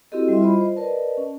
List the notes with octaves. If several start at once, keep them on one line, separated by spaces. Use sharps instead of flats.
C4 E4 F#4 G4 A4 D#5
G3 E4 E5 C6
F4 C5 D#5 B5
C5
A#4 B4 D5 D#5 A5
C#4